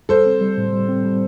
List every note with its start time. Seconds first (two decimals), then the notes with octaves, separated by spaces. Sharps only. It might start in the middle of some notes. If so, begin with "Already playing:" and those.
0.09 G3 A4 C5
0.26 C4
0.41 G3
0.57 A2
0.73 G3
0.89 C4
1.05 G3